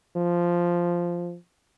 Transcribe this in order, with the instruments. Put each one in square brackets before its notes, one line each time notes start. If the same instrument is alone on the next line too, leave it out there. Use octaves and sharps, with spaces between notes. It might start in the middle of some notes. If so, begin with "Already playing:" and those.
[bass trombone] F3